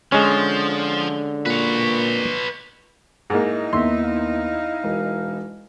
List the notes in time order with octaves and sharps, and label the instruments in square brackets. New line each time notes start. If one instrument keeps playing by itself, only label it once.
[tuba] D3 [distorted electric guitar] F3 [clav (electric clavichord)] G#3 C#4
[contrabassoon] A#2 [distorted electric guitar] B4 C#5
[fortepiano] G#2 A#3 [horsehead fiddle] D#4 E4
[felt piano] D#2 A#3 B3 [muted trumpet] E5 [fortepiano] C6
[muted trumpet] F5
[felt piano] E1 A#4